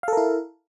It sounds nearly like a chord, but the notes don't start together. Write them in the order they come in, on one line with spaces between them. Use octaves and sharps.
F5 A4 A#4 E4